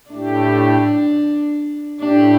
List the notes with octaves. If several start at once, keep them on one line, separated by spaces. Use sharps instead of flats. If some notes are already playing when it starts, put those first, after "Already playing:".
A2 A3 D4 G4
A2 A3 D4 G4